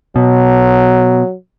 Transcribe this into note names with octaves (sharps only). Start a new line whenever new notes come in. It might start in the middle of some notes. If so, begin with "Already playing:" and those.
B2 F#3